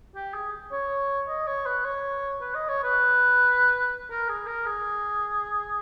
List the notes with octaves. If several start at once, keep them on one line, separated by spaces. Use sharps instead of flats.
G4
G#4
C#5
D#5
C#5
B4
C#5
B4
D#5
C#5
B4
A#4
G#4
A#4
G#4